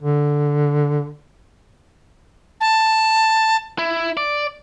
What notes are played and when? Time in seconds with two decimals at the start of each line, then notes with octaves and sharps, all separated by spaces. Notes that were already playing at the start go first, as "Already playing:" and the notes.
0.03 D3
2.61 A5
3.78 E4
4.17 D5